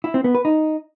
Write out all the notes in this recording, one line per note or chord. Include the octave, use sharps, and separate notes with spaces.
E4
C4
B3
B4
D#4